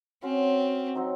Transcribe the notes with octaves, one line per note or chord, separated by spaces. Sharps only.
C4 C#4 F#4 C5
F#3 C4 D#4